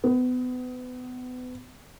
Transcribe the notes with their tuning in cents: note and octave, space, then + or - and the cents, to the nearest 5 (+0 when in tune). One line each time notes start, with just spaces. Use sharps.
B3 +30